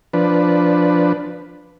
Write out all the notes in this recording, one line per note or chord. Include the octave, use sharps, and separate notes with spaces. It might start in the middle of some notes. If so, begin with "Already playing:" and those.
F3 D4 B4